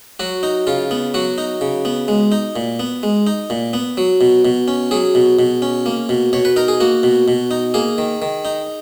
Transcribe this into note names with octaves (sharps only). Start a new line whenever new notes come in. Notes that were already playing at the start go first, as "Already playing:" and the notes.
F#3 F#4
D#4
C#3 F4
B3
F#3 F#4
D#4
C#3
B3
G#3
D#4
A#2
B3
G#3
D#4
A#2
B3
F#3
B2
B2
C#4
F#3 G#4
B2
B2
C#4
A#3
B2
B2 C#5
B4
D#4 A#4
G#4
A#3 F#4
B2
B2
D#4
A#3 G#4
D#3
D#3
D#4